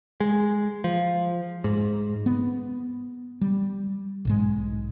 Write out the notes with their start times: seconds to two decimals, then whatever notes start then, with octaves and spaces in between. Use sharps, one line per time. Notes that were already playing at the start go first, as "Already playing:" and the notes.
0.20 G#3
0.84 F3
1.64 G#2
2.26 B3
3.41 G3
4.25 B1 G#2 G#3